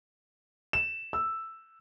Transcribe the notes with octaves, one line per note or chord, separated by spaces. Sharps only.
E7
E6